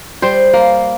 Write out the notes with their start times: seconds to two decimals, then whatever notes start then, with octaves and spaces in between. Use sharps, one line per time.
0.22 G3 C5
0.53 A#3